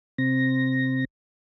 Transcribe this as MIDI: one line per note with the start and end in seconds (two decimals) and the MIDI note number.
0.18 1.05 48
0.18 1.05 60
0.18 1.05 94